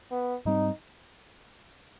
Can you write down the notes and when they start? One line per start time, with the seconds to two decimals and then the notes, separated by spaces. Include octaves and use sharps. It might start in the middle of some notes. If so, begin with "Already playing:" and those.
0.11 B3
0.45 G#2 G3 C4 D#4